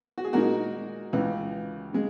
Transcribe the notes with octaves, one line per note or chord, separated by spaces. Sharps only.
F#4
G#4
A#2 G#3 D#4 F#4 A#4
C#2 C#3 E3
C#3 G#3